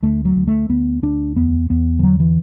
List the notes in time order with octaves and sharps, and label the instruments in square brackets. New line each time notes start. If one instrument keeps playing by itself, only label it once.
[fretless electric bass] D2 A3
F#3
D2
A3
D2 B3
D2 D4
E2 B3
E2 B3
E3
D3 F#3
E3